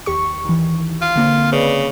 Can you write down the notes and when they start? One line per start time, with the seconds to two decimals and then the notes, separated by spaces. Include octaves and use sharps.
0.06 D#2 G4 C#6
0.45 D#3 E3
1.01 F4
1.16 D3 A#3 C4
1.52 C#3 B4 D5